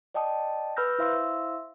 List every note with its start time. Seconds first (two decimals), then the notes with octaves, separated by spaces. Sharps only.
0.14 D5 D#5 G5 A5 D#6
0.76 B4 B5 E6 F6 G6 A#6
0.99 E4 C5 E5 F5 C6 E6